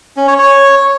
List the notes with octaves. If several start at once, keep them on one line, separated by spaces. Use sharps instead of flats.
C#4
C#5
C#5